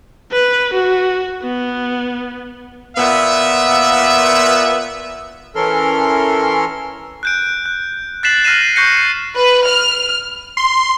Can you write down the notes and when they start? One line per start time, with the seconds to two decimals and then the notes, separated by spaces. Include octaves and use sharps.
0.32 B4
0.73 F#4
1.44 B3
2.97 A#2 B3 E5
5.55 E3 C#4 A4 A#4 C6 F6
7.23 F#6 G6 D7
7.66 F#6
8.23 F#6 A6 B6 C7 E7 F#7
8.44 F6 A#6 C7 D#7 E7 F#7
8.76 C#6 F#6 G6 A#6 C7 C#7
9.36 B4
9.66 F6
10.57 C6